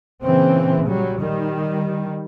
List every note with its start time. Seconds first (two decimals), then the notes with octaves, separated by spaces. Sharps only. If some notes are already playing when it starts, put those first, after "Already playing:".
0.24 A#2 C#3 E3 C4
0.86 F#3 G3
1.20 D#3 G3